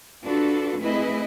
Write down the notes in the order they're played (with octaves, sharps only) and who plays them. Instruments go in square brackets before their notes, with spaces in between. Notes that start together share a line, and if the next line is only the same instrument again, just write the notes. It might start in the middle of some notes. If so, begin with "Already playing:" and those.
[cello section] D4 F4 F#4 A4 B4
A3 C4 E4 G#4 B4 D#5